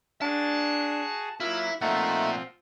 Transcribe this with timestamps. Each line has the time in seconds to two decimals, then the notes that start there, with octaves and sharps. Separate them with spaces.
0.22 D4 F#4 G#4 A5
1.40 F#3 A#3 E4 F4
1.81 A#2 F3 A3 C4 D#4 F4 E5 F#5